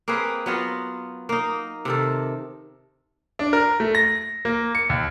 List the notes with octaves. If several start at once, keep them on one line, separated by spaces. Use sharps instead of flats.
A#3 C4 G#4 B4
F#3 B3 F4
A#3 D#4
C3 D#3 A4
D4
A#4
A3
A#6
A#3
C#7
D#2